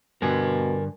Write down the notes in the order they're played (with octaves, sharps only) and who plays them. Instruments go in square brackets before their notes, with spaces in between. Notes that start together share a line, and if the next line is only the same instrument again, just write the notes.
[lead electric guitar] G2 D3 [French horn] B2 [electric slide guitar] A#4 G#5